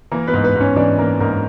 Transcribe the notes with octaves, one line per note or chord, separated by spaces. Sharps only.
E3 A#3 A#4
B3 B4
G#2
B3 B4
G#2
C#4 C#5
E3 D4 D5
E3 A#3 A#4
G#2 A#3 A#4